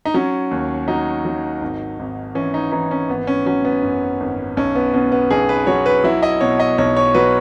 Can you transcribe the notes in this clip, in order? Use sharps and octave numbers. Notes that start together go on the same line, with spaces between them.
D#4
F#3 C#4
D#2
F#3 D#4
F#3
G#1
G#1
E3 C#4
D#4
E3 D#4
C#4
G#1 B3
C#4
F#3 C#4
B3
F#2
G#1
B1 C#4
B3
B2 C#4
B3
B1 G#4
B4
F#3 C#5
B4
F#3 E4
D#5
B2 C#5
D#5
B1 C#5
C#5
F#3 B4